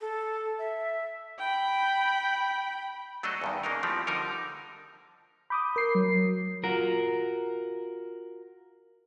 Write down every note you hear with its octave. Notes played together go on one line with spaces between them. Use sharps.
A4
E5
G5 B5
F#3 A3 D4 F#4 A4 D#5
E2 G2 D#3
C#3 A#3 D4 D#4 A#4
E3 F3 A3 C4 G4
D3 F3 G3 D#4 A#4
B5 D6 D#6 G6
A#4 C7
F#3
F4 F#4 A#4